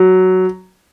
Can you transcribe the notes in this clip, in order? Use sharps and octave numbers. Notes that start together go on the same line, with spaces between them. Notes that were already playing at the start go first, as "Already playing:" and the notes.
Already playing: F#3